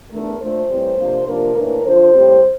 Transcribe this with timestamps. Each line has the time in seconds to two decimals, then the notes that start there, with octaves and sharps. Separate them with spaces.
0.10 E2 D3 A3 D4 A#4
0.39 A#2 A3 D4 C5
0.69 A2 E3 G3 C4
0.97 C3 F3 A#3 D4
1.27 C3 F3 A#3 D4 A#4
1.55 A2 E3 A#3 D4 A#4
1.85 F2 D3 F3 C5
2.14 A2 G3 C4